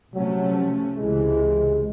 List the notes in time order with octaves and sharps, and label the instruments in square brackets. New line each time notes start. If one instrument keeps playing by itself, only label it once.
[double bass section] C3 F3 A3 C#4 [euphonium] F#3
[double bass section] C#2 C3 E3 [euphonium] G#3